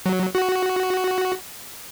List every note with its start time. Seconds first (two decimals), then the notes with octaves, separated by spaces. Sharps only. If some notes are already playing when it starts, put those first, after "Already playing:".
0.06 F#3
0.35 F#4